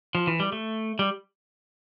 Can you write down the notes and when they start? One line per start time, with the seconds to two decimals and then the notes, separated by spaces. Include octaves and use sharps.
0.15 F3
0.27 E3
0.40 G3
0.52 A3
0.99 G3